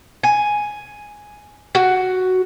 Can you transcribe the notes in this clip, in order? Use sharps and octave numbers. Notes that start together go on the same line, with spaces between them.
G#5
F#4